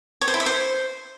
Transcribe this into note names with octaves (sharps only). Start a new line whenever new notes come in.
C#5
C5
E4
E5
C5